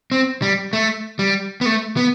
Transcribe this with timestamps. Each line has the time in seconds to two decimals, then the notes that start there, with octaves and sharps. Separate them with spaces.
0.12 C4
0.42 G3
0.73 A3
1.19 G3
1.61 B3
1.66 A3
1.97 B3